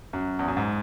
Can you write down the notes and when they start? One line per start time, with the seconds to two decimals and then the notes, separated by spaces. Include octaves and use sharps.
0.13 F#2
0.39 E2
0.48 F#2
0.57 G#2